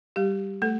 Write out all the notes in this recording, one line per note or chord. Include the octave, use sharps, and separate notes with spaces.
G3 G4
A3 A4